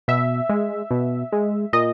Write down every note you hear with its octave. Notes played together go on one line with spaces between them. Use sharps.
B2 E5
G#3
B2
G#3
A#2 D#5